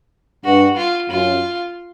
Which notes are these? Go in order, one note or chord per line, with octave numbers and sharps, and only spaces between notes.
G2 F#4
F4
F#2 F4